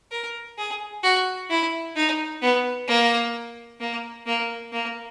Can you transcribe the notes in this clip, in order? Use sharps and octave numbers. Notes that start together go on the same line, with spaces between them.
A#4
G#4
F#4
E4
D#4
B3
A#3
A#3
A#3
A#3